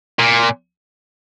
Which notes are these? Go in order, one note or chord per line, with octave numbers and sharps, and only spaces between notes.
A#2